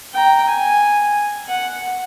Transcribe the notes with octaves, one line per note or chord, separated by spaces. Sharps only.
G5 A#5
G#5
F#5